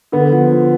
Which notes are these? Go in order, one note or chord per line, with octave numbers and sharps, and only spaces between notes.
D3 B3
F3
F3